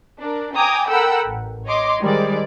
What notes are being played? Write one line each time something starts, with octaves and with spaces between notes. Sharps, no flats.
D4 A#4
G5 G#5 A#5 D6 D#6 G#6
A4 A#4 F#5 G5 B5 E6
A1
C#5 D#5 C6 D6
D#3 G3 G#3 C5 D5